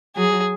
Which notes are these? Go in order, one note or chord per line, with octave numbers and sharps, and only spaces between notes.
F#3 G#4